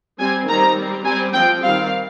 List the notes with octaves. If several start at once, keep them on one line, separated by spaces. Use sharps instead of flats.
G3 C4 G#5
D#3 G3 C4 A#5
G3 C4
G3 C4 G#5
F3 C4 G5
D#3 G3 C4 F5